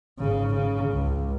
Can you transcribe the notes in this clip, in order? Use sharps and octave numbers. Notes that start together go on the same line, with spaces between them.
G#1 C#3
C#3
C#2